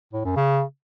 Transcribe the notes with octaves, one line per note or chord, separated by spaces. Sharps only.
A2
F#2
C#3